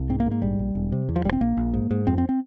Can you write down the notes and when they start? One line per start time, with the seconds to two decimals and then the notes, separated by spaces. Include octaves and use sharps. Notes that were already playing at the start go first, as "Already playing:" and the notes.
Already playing: C2
0.09 G#2 C4
0.20 A#3
0.26 G#2
0.31 A#3
0.42 A#1 G3
0.59 A#1
0.75 E1
0.92 C3
1.09 E2
1.16 F3
1.25 E1 G3
1.33 C4
1.41 A#1 A#3
1.57 A#1
1.73 G#2
1.91 G#2
2.07 F2 C4
2.18 C4
2.29 C4